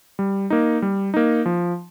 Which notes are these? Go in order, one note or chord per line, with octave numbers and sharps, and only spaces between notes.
G3
A#3 D#4
G3
A#3 D#4
F3